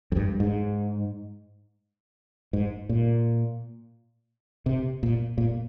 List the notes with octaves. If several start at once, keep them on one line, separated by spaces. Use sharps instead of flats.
F2
G2
G#2
G#2
A#2
C3
A#2
A#2